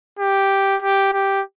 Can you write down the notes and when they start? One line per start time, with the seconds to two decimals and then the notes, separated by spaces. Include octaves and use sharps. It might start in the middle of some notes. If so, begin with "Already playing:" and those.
0.19 G4
0.82 G4
1.13 G4